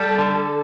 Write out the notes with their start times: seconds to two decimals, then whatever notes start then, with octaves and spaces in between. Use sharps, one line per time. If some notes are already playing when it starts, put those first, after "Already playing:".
Already playing: G3 A4
0.18 D3